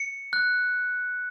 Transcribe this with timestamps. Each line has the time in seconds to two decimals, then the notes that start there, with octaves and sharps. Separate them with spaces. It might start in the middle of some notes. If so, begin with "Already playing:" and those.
Already playing: C#7
0.33 F#6